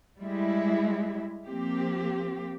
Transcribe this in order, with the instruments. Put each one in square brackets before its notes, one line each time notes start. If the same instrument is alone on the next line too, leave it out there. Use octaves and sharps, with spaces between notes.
[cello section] G3 G#3 E4
F3 A#3 C4 G4